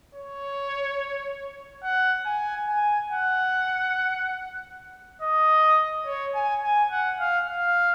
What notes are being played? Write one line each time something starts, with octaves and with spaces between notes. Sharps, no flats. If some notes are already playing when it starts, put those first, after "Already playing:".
C#5
F#5
G#5
G#5
F#5
D#5
C#5
G#5
G#5
F#5
F5
F5